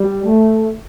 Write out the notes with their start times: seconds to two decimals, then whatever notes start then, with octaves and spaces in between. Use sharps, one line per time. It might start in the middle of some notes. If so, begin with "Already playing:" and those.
Already playing: G3
0.24 A3